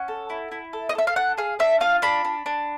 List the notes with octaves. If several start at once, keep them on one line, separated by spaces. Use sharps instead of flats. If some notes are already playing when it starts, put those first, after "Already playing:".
Already playing: C#4 F#5
A4
E4
E4
A4
D#5
A4 E5
F5
D4 F#5
G#4 F5
D4 E5
F4 F5
D4 B5
D4
D4